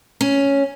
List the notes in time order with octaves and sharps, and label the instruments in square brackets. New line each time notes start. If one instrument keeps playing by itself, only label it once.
[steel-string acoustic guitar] C#4